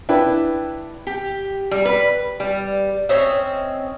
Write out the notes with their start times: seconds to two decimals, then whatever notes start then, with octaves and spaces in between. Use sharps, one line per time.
0.09 D4 E4 B4 G5
1.07 G4
1.71 G3
1.85 B4
2.40 G3
3.09 C4 C#4 D#5 E5